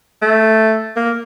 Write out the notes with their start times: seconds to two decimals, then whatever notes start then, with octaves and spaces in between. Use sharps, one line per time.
0.22 A3
0.97 A#3